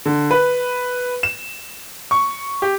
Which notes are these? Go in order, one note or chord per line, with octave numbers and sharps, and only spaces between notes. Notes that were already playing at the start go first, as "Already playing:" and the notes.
D3
B4
E7
C#6
G4